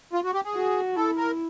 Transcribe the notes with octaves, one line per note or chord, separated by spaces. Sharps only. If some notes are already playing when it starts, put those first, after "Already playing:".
F4
F#4
G4
G#4
F#4
E4 A4
A#4